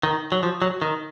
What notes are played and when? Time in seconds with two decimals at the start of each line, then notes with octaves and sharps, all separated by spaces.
0.03 D#3
0.32 F#3
0.43 F3
0.62 F#3
0.82 D#3